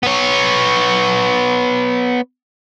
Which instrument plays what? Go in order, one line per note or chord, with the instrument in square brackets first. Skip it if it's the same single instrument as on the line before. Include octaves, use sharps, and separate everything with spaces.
[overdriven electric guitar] B3 C#5